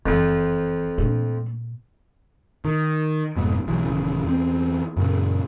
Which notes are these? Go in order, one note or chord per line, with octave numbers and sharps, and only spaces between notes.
F#1 F2 E3 F3
A#2 A3 D4
D#3
F1 F2 G#2 B2
B1 E3 F#3
D#1 C#3 E3
E2 C4
F#2 A#2 C#3